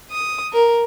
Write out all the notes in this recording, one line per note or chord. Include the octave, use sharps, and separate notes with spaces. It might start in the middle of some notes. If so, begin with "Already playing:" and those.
D#6
A#4